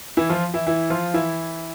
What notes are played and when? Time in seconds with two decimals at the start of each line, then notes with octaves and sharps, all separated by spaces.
0.17 E3 E4
0.29 F3 F4
0.54 E3 E4
0.67 E3 E4
0.90 F3 F4
1.14 E3 E4